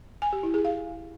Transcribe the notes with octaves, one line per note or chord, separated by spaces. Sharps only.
G#5
G4
E4
G#4
F5